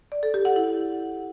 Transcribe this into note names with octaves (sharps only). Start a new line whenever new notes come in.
D5
A4
G4
F#5
E4